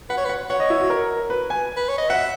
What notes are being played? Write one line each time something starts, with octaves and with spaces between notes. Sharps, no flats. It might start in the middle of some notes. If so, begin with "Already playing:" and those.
B4 F#5
C#5
B4
F#5
C#5 F#5
D#5
E4
F#4
A#4
B4
G#5
B4
C#5
D#5
E5 F#5